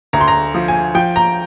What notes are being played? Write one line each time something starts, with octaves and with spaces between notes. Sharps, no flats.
D2 A#5
C6
A#5
F3
G#5
F3 G5
A#5